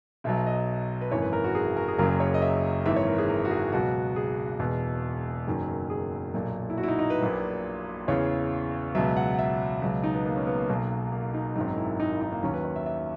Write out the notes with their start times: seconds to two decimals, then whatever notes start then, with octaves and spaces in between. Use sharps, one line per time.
0.24 B1 B2 F#3 E5
0.46 D#5
1.01 B4
1.11 G#1 F#2 E3 C#5
1.22 B4
1.33 A#4
1.44 F#4
1.55 G#4
1.77 A#4
1.88 G#4
1.98 F#1 F#2 C#3 F#3 A#4
2.09 A#4
2.20 C#5
2.34 D#5
2.42 E5
2.85 G#1 G#2 E3 E5
2.96 C#5
3.07 A#4
3.18 G#4
3.29 A#4
3.45 F#4
3.51 G#4
3.73 C#2 B2 F#3 F#4
4.16 G#4
4.59 E1 E2 B2
5.47 F#1 F#2 D#3 F#3
5.90 G#4
6.34 B1 A#2 F#3
6.70 E4
6.77 F#4
6.83 E4
6.88 D#4
6.99 D#4
7.10 B4
7.21 A#1 A#2 F#3
8.08 E2 C#3 E3 C#5
8.95 C#2 B2 F#3 E5
9.16 F#5
9.34 F#5
9.39 E5
9.82 C#2 B2 F#3
10.04 D#4
10.14 B3
10.25 A#3
10.36 C#4
10.47 B3
10.58 A#3
10.69 B1 B2 F#3
11.12 A#3
11.34 D#4
11.56 G#1 F#2 D#3 F#3 D#4
11.78 E4
12.00 D#4
12.11 E4
12.21 D#4
12.32 A#3
12.43 D#2 D#3 F#3 C#4
12.54 B4
12.65 C#5
12.76 E5
12.86 E5